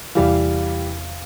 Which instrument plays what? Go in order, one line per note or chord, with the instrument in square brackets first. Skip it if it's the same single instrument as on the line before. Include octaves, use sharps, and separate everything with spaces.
[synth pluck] E2 C3 F5 [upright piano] E3 G3